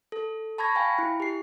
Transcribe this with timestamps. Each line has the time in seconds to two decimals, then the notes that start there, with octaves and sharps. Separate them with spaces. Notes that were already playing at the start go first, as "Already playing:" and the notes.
0.12 A4
0.58 A5 B5 C#6 G#6 A#6
0.75 F5 G5 G#5 B5
0.98 E4
1.20 G4 C7